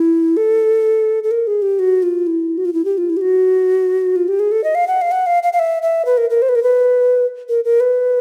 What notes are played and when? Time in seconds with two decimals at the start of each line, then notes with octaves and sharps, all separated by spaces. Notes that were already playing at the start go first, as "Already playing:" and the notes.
Already playing: E4
0.37 A4
1.24 A4
1.31 A#4
1.47 G#4
1.62 G4
1.79 F#4
2.03 F4
2.27 E4
2.58 F#4
2.65 F4
2.73 E4
2.85 G4
2.98 F4
3.10 E4
3.17 G4
3.21 F#4
4.16 F4
4.28 G4
4.40 G#4
4.52 A4
4.64 D#5
4.75 F5
4.87 F#5
5.01 F5
5.11 F#5
5.26 F5
5.43 F5
5.53 F5
5.59 E5
5.82 E5
6.06 B4
6.18 A#4
6.30 A#4
6.42 C5
6.49 B4
6.55 A#4
6.63 B4
7.49 A#4
7.64 A#4
7.80 B4